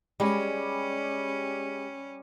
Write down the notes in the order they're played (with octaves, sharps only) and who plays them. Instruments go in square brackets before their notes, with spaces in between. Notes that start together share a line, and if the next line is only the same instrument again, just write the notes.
[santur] G3 [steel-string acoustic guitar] G#3 [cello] C#4